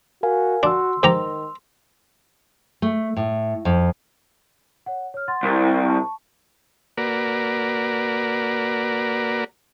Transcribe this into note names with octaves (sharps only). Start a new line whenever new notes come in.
F#4 A#4 F5 G#5
D4 F#4 C6 E6
G#2 D#3 G4 A#5
A3
A2
F2
C#5 F#5
C#5 F6
F#5 C6 A6
C2 E4 A#4 A6
A5 C#6
A#3 F#4 A#4 B4 D5